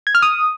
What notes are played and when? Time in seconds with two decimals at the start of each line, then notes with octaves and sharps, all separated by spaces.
0.07 G#6
0.15 F6
0.22 D#6